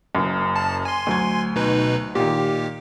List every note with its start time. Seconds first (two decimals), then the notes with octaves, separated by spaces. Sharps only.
0.15 F#1 F#2
0.56 A5
0.85 G#5 C6
1.07 D2 F#3 G#6
1.56 B2 D#4 B4
2.15 A#2 D#3 G4